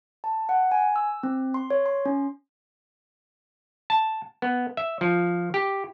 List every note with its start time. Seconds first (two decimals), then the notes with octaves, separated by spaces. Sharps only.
0.24 A5
0.49 F#5
0.72 G#5
0.96 E6
1.23 C4
1.54 C6
1.70 C#5
1.86 C6
2.06 C#4
3.90 A5
4.42 B3
4.77 E5
5.01 F3
5.54 G4